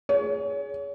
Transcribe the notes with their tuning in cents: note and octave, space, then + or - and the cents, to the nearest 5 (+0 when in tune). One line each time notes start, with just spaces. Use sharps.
G#4 +0 C#5 +30